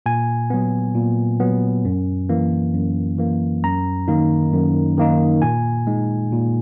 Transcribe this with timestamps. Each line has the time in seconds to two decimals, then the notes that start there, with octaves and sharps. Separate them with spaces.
0.06 A#2 G#5
0.50 F#3 B3
0.95 A#2
1.40 F#3 B3
1.85 F#2
2.29 E3 A#3
2.74 F#2
3.18 E3 A#3
3.64 F#2 A#5
4.08 D#3 A#3 D#4
4.52 F#2
4.97 D#3 A#3 D#4
5.42 A#2 G#5
5.87 G#3 D#4
6.32 A#2